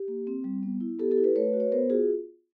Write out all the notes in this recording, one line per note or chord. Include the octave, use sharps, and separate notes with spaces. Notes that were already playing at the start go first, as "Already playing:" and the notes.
Already playing: G4
A#3
C4
G3
B3
E4
B3 G4 A4
G4 A4
E4
A4 B4
A3 B4 C#5
F#4
C#5
B3 A#4 C5
F4 F#4 G#4